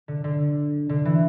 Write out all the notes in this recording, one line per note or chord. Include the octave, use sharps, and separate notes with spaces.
D3
D3
D3
E3